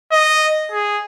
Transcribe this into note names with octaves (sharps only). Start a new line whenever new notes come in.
D#5
G#4